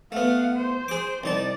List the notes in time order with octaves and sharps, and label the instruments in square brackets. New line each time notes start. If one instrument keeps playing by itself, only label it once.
[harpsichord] A3 B3 [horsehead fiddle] F5 F#5
[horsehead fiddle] C5
[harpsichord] G#4 D6
[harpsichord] C2 D#4 A5 [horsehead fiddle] D5